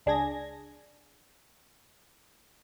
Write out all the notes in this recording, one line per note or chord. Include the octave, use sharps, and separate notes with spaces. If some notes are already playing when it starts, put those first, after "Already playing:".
C#2 D4 G#4 G#6 A#6